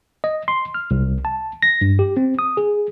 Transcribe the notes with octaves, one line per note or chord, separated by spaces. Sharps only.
D#5
C6
F6
C2
A5
A#6
G2
G4
C4
D#6
G#4